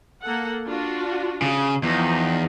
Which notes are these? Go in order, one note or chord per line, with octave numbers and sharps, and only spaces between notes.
A#3 A4 F#5
D4 F4 F#4
C#3
E2 F3 D#4 G5